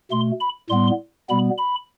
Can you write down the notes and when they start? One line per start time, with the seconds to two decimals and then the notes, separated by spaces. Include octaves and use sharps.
0.11 B2 A3 C6
0.40 B5
0.70 A2 G3 B3 C6
1.29 B2 G3 B3 B5
1.58 B5